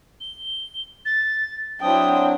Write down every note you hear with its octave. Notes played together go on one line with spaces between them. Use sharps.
G7
A6
F#3 C4 D4 E4 G5 D#6